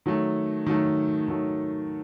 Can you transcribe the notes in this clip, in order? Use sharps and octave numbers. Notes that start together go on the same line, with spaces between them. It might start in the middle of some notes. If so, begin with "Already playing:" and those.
D#3 F#3 A3
D#3 F#3 A3
D#3 F#3 A3